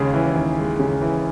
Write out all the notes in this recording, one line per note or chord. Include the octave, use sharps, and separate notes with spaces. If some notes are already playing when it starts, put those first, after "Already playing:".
Already playing: D#2 C#3 G#3
E3
D#2
G#3
C#3
E3